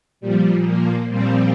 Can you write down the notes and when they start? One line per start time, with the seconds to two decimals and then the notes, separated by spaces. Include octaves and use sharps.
0.21 A#2 F3 G3
0.65 A#3
1.09 A#2 F3 G3 C4